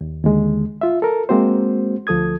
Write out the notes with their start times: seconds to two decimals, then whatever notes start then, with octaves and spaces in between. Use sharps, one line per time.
0.01 D#2
0.24 D#2 D3 G#3
0.81 F4 E5
1.02 A4 A#4
1.29 G#3 A#3 C4 F#4 C5
2.07 D2 F3 A4 D#6 G#6